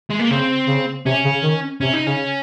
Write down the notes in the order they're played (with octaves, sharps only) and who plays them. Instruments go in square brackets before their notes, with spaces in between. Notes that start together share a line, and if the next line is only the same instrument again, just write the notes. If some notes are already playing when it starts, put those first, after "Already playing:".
[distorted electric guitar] G#3
A#3
[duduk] C#3 [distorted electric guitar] C4
[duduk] C#3
[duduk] C3 [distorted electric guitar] C#4
[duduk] C#3
D#3
[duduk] C3 [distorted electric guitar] C#4
[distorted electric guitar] D#4
[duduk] C#3 [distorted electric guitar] C#4